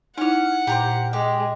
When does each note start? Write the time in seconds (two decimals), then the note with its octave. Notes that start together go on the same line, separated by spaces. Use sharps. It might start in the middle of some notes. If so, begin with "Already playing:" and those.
0.18 C#4 D#4 E4 F#5 F6
0.67 A#2 G4 A#4 C5
1.13 G#3 G4